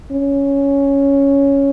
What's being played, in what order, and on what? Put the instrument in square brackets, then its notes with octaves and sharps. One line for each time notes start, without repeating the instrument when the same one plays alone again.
[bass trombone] C#4